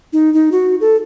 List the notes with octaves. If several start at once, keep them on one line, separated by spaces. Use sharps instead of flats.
D#4
D#4
F#4
A4